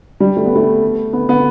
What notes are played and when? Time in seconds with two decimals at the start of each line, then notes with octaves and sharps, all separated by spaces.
0.20 G3
0.37 A3
0.46 B3
0.56 A3
1.13 B3
1.29 B3